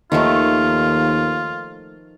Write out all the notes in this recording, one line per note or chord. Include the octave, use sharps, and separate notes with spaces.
D#2 D#3 F3 A3 F4